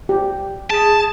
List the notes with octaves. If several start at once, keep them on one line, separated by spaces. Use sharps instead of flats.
G4
G#4 A5